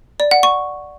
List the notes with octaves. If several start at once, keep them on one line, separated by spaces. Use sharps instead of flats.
D5
F#5
C#6